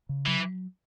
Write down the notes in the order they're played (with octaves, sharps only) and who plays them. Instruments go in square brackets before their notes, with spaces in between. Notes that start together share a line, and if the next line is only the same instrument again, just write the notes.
[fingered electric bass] C#3
[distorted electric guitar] E3 [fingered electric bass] F#3